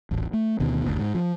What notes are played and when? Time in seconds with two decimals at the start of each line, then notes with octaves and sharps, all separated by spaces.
0.11 D#1 A1
0.33 A3
0.60 D2 B2 D#3
0.86 F#1 D2
0.99 G#2
1.15 F3